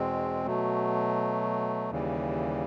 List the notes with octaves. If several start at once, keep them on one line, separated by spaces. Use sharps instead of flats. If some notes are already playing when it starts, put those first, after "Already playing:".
Already playing: E2 B2 G#3 C4
B2 F#3 A3
D#2 C#3 E3 G3